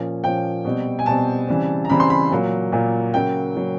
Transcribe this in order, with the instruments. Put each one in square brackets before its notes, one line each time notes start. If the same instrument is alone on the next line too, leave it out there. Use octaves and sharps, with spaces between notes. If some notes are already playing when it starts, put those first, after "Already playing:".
Already playing: [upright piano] A#2 F3 A#3 C#4
A#2 F3 A#3 C#4 G5
B2 G3 C4
G#5
B2 G3 C4 A5
C#3 E3 G3 C4
A#5
C#3 E3 G3 C4 B5
C6
B5
A#2 F#3 A#3
A#2 F#3 A#3
C#3 F#3 A#3 G5
C#3 F#3 A#3